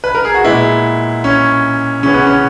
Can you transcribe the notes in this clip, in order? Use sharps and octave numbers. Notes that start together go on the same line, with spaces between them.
B4
A#4
G#4
F#4
A#2 G#3 B3 E4
C#4
C#3 E3 B3 C#4
B3
C#4